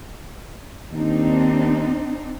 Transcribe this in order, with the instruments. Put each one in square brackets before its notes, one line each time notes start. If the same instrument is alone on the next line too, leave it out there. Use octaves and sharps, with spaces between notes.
[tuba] D#2 [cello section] C4 D4 D#4